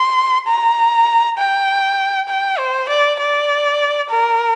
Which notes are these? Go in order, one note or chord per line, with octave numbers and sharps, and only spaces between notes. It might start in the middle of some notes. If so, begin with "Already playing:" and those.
Already playing: C6
A#5
G5
G5
C5
D5
D5
A#4